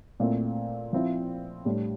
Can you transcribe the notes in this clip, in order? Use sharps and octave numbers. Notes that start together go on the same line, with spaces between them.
A#2 A3 C4 E4
F3 C4 E4
A2 G3 D4